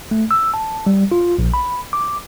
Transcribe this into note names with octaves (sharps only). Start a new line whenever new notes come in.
A3
E6
A5
G3
F4
A#1
B5
D6